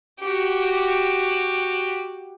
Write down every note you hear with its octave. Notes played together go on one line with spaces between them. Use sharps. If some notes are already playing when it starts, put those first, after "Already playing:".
F#4 G4